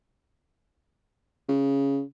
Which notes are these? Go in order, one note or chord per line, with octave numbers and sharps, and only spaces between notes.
C#3